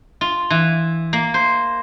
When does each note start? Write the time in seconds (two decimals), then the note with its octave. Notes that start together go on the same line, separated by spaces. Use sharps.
0.21 F4
0.50 E3
1.13 A#3
1.34 C5